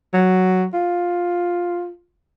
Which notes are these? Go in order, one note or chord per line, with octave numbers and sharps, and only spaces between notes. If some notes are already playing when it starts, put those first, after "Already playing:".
F#3
F4